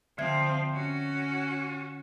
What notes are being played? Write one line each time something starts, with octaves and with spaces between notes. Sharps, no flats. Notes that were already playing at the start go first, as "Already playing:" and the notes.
D3 F3 C4 E5 G#6
C#4 F#4